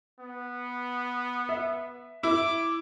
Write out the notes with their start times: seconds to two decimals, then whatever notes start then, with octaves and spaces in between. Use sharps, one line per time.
0.20 B3
1.49 E5
2.23 E4 D6